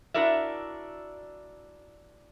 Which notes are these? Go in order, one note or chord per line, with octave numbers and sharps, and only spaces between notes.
D4 E4 F#4 A#4 D5 E5